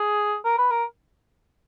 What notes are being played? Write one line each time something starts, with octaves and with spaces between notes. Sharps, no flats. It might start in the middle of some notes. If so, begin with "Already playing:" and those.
Already playing: G#4
A#4
B4
A#4